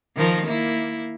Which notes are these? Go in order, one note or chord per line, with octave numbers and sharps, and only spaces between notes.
D#3 F3 A#4
A#3 E4